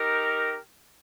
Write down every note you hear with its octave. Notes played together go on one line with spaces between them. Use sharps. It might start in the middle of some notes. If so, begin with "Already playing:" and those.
Already playing: D#4 G4 A#4